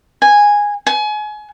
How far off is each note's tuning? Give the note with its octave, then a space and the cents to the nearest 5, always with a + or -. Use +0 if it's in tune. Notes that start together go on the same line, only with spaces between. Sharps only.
G#5 -10
G#5 +30